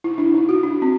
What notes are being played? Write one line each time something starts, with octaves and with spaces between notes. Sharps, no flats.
E4
D4
D#4
F#4
D4
C4